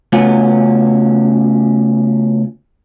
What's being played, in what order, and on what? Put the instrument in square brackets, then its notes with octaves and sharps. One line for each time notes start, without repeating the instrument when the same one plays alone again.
[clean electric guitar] C#3 A3 B3 C#4 F4 F#4